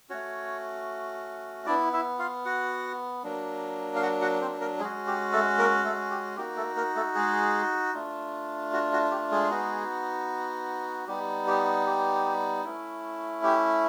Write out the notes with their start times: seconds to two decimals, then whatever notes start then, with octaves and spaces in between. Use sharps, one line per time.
0.10 A3 C#4 F#4 C#5
1.66 B3 D4 E4 D5
1.93 E4 E5
2.19 F4 F5
2.45 F#4 F#5
3.24 F#3 A#3 D4
3.96 F5
4.02 F#4 F#5
4.21 F#4 F#5
4.41 C4 C5
4.61 A#3 A#4
4.80 G#3 C#4 F#4 G#4
5.07 G4
5.32 A3 A4
5.58 A#3 A#4
5.84 A3 A4
6.10 G4
6.37 A#3 D#4 F#4 G4
6.57 A3 A4
6.76 A#3 A#4
6.95 A3 A4
7.15 G#3 G#4
7.94 A3 D4 F4
8.73 F#4
8.93 F#4
9.11 G4
9.32 G#3 G#4
9.50 B3 D#4 F#4
11.07 G3 B3 D#4 G4
11.47 G4
11.86 G4
12.64 A3 C#4 E4
13.43 G4